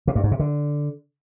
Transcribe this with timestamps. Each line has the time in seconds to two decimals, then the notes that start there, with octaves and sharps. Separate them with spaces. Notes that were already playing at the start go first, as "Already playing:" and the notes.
0.08 C3
0.16 G2
0.23 G#2
0.31 C3
0.39 D3